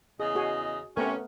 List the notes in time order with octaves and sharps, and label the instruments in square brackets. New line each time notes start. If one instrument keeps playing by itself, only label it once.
[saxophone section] E2 C#3 D#5 [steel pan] G#4
[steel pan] F#4 G#4
[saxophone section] C3 C#4 [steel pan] A3 B3 A#4